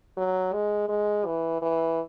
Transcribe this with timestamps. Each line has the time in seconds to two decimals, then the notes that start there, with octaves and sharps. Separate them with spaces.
0.17 F#3
0.53 G#3
0.89 G#3
1.26 E3
1.62 E3